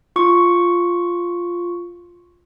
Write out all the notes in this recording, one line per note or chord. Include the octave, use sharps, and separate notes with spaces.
F4 C#6